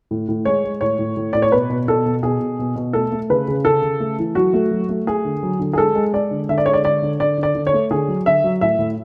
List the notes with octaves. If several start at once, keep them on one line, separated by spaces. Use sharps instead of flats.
A2
A2
G#3 C#5
G#3
A2 C#5
A2
A2
A2 D5
C#5
B2 B4
B2
B2 A4
B2
B2 G#4
B2
B2
B2
A3 A4
A3
C#3 B4
C#3
C#3 A4
C#3
A3
E3
F#3 F#4
A3
F#3
A3
A3 G#4
D3
F#3
D3
G#4
G#3 A4
G#3
G#3 D5
D3
D3 E5
D5
G#3 C#5
D5
D3 D5
D3
D3 D5
D3
D5
D3
C#5
A3
D3 G#4
F#3
D3 E5
F#3
A2 E5
A2